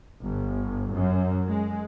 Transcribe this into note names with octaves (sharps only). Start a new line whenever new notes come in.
G1
F#2
G#3